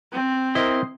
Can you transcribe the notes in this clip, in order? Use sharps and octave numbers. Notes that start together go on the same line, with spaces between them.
C4
E4 A#4 C5 D#5